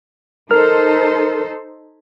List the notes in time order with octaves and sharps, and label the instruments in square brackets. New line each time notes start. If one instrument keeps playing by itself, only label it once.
[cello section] D#4 A4 C5 [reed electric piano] A#4 F6